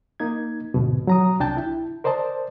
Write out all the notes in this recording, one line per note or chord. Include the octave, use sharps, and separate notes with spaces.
A#3 D#4 G#6
D2 G#2 B2
F#3 A#5 D#6
C2 D4 G5 A5 G6
E4
A#4 C5 D5 D#5 A5